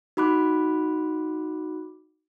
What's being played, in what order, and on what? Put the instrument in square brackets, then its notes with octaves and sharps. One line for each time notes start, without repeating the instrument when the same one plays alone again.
[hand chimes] D#4 F#4 B5 D6 F#6